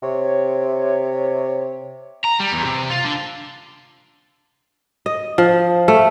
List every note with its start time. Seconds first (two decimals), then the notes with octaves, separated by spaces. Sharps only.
0.02 C3 C#5
2.25 A#5
2.40 G3
2.52 E2
2.65 C3
2.90 F4
3.04 D3
5.06 D#5
5.38 F3
5.88 A3